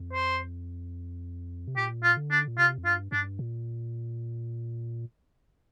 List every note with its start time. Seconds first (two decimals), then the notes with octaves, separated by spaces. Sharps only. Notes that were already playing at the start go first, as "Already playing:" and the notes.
Already playing: F2
0.13 C5
1.68 C3
1.76 A#2 G4
2.03 F4
2.17 D3
2.31 D4
2.48 A#2
2.58 C3 F4
2.78 F2
2.85 G2 F4
3.12 G2 D4
3.39 A#2